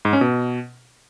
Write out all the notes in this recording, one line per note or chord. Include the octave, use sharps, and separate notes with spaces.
G#2
C#4
B2